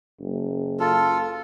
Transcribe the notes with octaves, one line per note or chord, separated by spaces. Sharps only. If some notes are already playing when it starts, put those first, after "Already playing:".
F#1
F4 A4